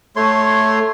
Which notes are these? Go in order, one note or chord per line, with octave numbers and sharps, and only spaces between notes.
A3 C#5 C6